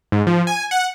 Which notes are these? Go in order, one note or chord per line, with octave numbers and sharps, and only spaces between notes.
G#2
F3
G#5
F#5